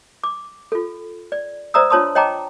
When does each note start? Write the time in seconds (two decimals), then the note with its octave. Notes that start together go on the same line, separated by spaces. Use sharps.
0.24 D6
0.72 F4 A4
1.32 D5
1.74 C5 D5 E5 A#5 D#6 E6
1.90 D4 F4 C#5 A5 C6 D#6
2.15 C#5 D#5 G5 A5 A#5 D6